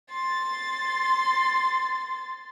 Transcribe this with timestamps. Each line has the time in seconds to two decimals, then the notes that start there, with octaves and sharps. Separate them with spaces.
0.10 C6 A6